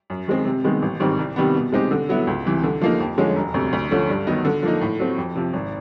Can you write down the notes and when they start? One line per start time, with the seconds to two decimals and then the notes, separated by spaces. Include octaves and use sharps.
0.10 F#2
0.28 D#3 G#3 C4
0.45 C3
0.64 D#3 G#3 B3
0.82 A1
1.00 G#2 D#3 G3 C4
1.18 C2
1.36 C3 D#3 G3 B3
1.55 B2
1.72 G#3 C4 D#4 G4
1.91 D3
2.09 F#3 B3 E4
2.27 C#2
2.45 C3 E3
2.63 D3
2.81 F3 A#3 D#4
3.00 F2
3.18 D3 F3 G#3 C#4
3.36 E1
3.54 D2 C3
3.73 D2
3.91 D3 F3 A3 C#4
4.09 G2
4.27 D#3 F#3 B3 D#4
4.45 D3
4.63 F3 A#3 D#4
4.81 A2
4.99 F#3 A3 C4
5.17 F2
5.35 C3 F3
5.53 G#1